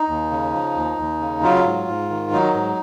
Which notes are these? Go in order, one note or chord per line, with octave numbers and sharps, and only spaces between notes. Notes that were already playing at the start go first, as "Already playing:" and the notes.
Already playing: D#4
D#2
C#3
F3
D#2
D#2
C#3
F#3 F4
G#2
G#2
D#3
F#3 D#4
G#2